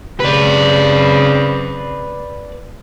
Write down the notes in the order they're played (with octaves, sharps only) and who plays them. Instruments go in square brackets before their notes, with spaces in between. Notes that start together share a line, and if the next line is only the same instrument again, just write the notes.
[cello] C#3 C4 [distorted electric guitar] B4 D5